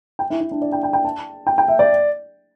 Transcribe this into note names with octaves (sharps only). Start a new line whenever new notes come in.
G5
E4
E4
D4
D5
G5
G5
G5
A5
G5
G5
E5
D5